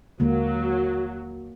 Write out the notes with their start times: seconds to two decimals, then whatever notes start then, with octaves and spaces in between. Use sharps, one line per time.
0.20 D#2 D3 F#3 G#3 A#3